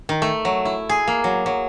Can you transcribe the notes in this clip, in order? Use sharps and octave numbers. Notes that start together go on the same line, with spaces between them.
D#3
A3
F#3
E4
G#4
A#3
F#3
F#3